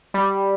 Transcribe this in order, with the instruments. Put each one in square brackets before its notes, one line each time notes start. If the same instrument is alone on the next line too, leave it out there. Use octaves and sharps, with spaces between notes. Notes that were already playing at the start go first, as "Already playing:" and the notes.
[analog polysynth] G3